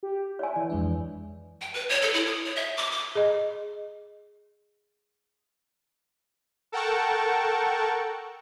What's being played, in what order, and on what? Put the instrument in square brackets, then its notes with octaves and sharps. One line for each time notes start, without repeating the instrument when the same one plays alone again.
[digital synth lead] G4
[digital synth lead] E4 [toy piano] C#5 D5 G#5
[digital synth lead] E3 [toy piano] D5
[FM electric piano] F2 G#3 D4
[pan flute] G5
B4
C#5
A4
E4
D#6
C#5
E5
D6
D6
[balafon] G#4 D#5
[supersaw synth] A4 A#4 F#5 G5 A5 C#6